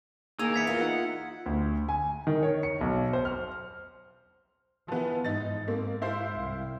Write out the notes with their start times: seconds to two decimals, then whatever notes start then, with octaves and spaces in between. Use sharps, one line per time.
0.39 A#3 D#4 G#4 A#4 E6 G#6 F7
0.54 B3 E4 G#6 B6 C#7
0.67 F4 A#4
0.81 D#4 F#5
1.46 D2
1.89 G#5
2.27 D#3
2.43 C#5
2.63 C#7
2.81 B1
3.13 C5
3.25 F6
4.88 E3 F3 B3
5.25 G#2 D#4 A6
5.68 A#3 C4
6.02 E4 C5 F5
6.35 C2